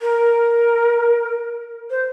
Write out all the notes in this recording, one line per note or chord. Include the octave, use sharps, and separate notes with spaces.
A#4
C5